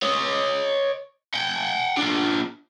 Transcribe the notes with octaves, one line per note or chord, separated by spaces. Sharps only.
C#5 D#5
F#5 G5
D4 F4